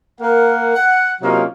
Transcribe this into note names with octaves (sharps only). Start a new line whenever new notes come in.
A#3 A#4 F#5
F#5
C3 F#3 A#3 C#4 D#4 F4